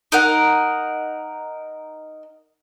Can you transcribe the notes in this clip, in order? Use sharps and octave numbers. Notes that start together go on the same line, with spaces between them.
D#4 A#4 F#5